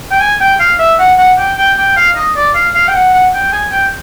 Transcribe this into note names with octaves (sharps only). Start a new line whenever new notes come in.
G5
G#5
G5
F5
E5
F#5
F#5
G5
G5
G5
F5
D#5
D5
F5
F5
G5
F#5
F#5
G5
G#5
G5